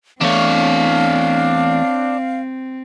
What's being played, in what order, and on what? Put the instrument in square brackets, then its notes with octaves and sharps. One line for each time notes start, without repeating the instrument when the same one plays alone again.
[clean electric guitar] E2 A3 [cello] C4 [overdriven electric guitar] D4 C#5 [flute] F5